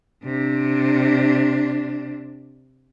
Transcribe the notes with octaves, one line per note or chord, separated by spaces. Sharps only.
C3 D4